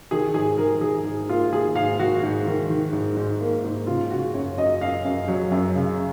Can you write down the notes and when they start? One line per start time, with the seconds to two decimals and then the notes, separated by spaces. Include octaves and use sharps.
0.11 D#3 G#4
0.34 G#2 G#4
0.58 D#3 A#4
0.81 D#3 G#4
1.05 G#2
1.29 A#3 F4
1.52 D#3 G#4
1.75 G#2 F5
1.99 D#3 F#4
2.23 G#2
2.47 D#3
2.70 D#3
2.93 G#2
3.17 G#2
3.40 A#3
3.64 G#2
3.87 C#3 F4
4.10 C#3 F#4
4.34 F#2 C#5
4.58 F#2 D#5
4.81 F#2 F5
5.05 F#2
5.28 F#3
5.52 F#2
5.75 C#3